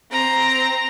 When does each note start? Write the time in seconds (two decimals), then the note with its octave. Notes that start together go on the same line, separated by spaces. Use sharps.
0.12 C4 A#5